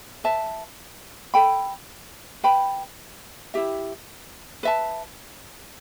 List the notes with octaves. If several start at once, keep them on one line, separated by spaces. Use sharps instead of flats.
B4 E5 A5
A4 G5 B5
B4 G5 B5
E4 G4 E5
B4 E5 A5